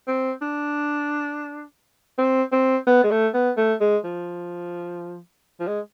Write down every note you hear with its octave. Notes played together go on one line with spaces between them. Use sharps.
C4
D4
C4
C4
B3
G#3
A3
B3
A3
G#3
F3
F3
G#3